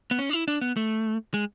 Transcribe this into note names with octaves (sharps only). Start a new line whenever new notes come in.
B3
C#4
D4
E4
D4
B3
A3
G#3